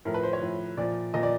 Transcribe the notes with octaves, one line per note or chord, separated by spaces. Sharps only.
A2 F3 A#4
B4
C5
C#5
A2 F3
A#2 F3 D5
A#2 F3 D#5
D5